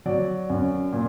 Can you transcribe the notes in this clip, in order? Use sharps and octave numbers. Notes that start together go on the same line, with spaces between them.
F#3 D5
F#2
A#2